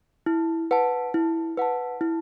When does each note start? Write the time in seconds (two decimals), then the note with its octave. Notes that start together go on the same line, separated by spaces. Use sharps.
0.26 E4
0.71 B4 F#5 A5
1.14 E4
1.57 B4 F#5 A5
2.01 E4